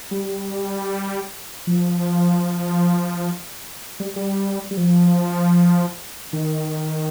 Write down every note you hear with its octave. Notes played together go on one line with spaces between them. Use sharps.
G3
F3
G3
G3
G3
F3
D#3